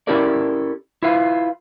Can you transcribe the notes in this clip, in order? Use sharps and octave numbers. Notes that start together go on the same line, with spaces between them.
C#4 E4 G4 A4 A#4 D5
E4 F4 B4 F5